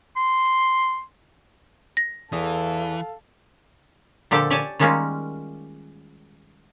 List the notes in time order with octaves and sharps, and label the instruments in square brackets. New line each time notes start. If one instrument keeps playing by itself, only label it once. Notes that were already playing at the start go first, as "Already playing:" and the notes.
[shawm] C6
[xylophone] A#6
[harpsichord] E2 D#6 [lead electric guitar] E3 [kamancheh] A4 F5
[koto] A#2 D3 F3 G4 A4 A5
G4 C#5 D5 G#5 A5
D#3 G3 G#3 A#3 C#4 F4